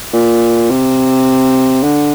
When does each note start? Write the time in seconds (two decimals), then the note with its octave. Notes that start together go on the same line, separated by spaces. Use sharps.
0.13 A#2
0.70 C3
1.83 D3